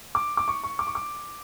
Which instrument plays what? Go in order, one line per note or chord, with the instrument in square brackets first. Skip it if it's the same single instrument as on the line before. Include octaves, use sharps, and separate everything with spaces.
[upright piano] D6
D6
C#6
C#6
D6
C#6
D6